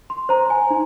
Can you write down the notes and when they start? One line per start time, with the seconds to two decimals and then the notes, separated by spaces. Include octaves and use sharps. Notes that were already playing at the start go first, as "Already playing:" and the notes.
0.10 C6
0.29 C5 A#5
0.50 G#5
0.70 D#4